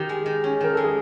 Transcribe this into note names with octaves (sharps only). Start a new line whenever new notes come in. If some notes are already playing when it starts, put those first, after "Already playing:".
Already playing: D#3 G4
G#3
D#3
C#4
D#3 A#4
G#3 A4
G#4